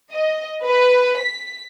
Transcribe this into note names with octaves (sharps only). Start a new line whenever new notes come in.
D#5
B4
B6